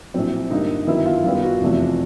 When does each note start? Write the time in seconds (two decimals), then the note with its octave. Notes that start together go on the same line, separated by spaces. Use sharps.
0.14 A#1 A2 F#3 C4
0.51 G2 D3 G3 A#3 D#4
0.87 F#2 D#3 F#3 B3 E4
1.06 F4
1.24 F#2 D#3 G3 B3 F4
1.43 F#4
1.61 F1 E2 C3 F3 A3